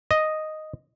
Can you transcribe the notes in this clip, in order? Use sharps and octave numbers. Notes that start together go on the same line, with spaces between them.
D#5